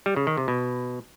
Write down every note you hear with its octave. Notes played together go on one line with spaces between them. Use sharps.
G3
C#3
D#3
C3
B2